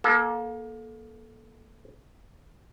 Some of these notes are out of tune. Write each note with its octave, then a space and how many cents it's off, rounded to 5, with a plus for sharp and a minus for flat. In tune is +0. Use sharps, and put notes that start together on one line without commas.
A#3 +25 A4 -15